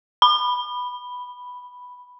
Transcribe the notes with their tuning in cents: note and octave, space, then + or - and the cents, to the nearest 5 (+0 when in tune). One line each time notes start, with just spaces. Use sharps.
B5 +0